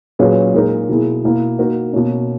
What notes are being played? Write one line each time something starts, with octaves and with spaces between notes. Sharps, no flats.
A#2 F#3 C#4 G#4 B4
A#2 G#3 D#4 A#4
B2 A#3 E4 G#4
B2 A#3 E4
A#3 D#4 F#4 A#4
B2 A#3 C#4